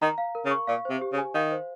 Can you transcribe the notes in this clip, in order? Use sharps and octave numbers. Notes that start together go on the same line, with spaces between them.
D#3 A#5
F5
A#4
C#3
C#6
A#2 F5
C3 C5
G4
C#3
G#5
D#3 F5
C5